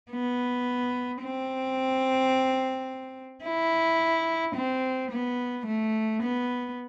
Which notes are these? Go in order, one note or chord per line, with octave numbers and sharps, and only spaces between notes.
B3
C4
E4
C4
B3
A3
B3